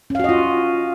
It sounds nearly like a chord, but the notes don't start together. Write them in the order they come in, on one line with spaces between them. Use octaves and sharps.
C#4 F5 F#4 D#5 F4